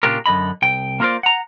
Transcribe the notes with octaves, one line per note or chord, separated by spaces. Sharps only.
A#2 C#3 D4 F4 G4 A#4
F#2 D3 D#5 B5
C2 G5
A#3 F4 A#4 C5 D5
F#5 A#5